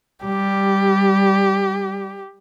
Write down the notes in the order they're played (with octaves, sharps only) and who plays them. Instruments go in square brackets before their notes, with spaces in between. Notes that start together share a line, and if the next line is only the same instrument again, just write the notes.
[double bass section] G3 [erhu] G4